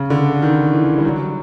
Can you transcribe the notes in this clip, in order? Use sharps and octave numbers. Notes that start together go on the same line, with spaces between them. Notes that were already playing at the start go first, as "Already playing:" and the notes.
Already playing: C#3
D3
D#3
E3
G3
F#3